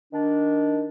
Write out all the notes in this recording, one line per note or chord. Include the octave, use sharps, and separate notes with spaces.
D#3 D4